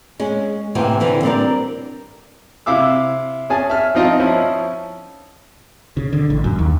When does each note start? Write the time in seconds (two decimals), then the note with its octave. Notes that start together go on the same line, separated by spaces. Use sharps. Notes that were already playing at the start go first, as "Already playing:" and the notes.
0.20 G#3 C#4
0.75 A2 C3 E3 A#3 C4
1.00 D3 E3 C4
1.23 G3 C4 D4 G#4 A#4 D5
2.66 C3 E4 F5 D6 E6
3.50 C#4 G#4 G#5 A5
3.70 E5 F6
3.95 F3 C4 D#4 F4 D#5
4.20 F3 C#4 E4
5.97 C#3
6.13 D3
6.30 A1
6.44 F#2
6.59 D#2